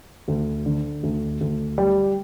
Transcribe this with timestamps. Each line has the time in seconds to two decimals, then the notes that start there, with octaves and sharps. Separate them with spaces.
0.28 D2
0.66 D3
1.03 D2
1.41 D2
1.78 G3